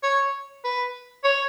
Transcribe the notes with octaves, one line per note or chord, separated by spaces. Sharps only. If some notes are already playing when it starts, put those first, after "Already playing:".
C#5
B4
C#5